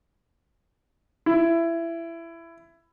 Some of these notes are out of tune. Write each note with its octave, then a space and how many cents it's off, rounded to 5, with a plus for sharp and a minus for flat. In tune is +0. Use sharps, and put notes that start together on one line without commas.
E4 +20